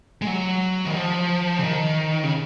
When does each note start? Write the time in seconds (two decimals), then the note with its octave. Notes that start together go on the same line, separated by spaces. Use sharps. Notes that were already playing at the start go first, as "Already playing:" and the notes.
0.22 G#3
0.27 F#3
0.85 D#3
0.95 F3
1.58 C#3
1.64 D#3
2.24 C#3